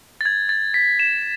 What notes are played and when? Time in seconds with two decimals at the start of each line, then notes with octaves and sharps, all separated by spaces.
0.21 A6
0.25 G#6
0.49 A6
0.74 B6
0.99 E7